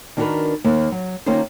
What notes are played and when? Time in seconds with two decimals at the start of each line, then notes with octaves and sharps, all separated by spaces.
0.17 D#3 D4 F#4 G#4 A#4 B4
0.64 D#2 A#3
0.92 F#3
1.26 D#3 A#3 C#4 D#4 F4 C5